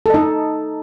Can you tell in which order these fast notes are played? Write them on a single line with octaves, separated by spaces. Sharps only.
A4 D#5 D#4